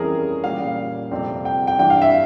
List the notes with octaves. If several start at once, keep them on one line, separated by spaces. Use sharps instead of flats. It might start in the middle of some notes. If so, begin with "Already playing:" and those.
Already playing: F2 E3 G3 C#4 G#4 A#4
A#2 G3 C#4 F5
F2 C3 G3 C4
G5
G5
G2 E3 G3 G5
F5
E5